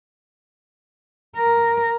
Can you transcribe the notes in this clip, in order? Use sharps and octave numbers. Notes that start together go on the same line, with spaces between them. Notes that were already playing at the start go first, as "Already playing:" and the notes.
A#4